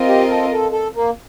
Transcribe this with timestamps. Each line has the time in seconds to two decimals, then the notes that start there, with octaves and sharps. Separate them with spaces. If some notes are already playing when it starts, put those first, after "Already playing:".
Already playing: C4 F4 A#4 D#5
0.09 G4
0.30 A4
0.52 A4
0.73 A4
0.95 A#3